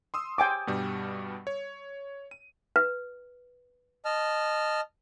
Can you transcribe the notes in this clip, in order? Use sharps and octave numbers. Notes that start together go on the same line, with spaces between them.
C6 D#6 E6
G5 G#5 D6
G2 B2 G3
C#5
D#7
B4
D#5 A5 F6